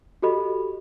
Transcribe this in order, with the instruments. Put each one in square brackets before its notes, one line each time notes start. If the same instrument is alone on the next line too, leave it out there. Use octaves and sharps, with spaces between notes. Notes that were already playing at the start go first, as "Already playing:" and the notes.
[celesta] F#4 G4 A4 D#5 B5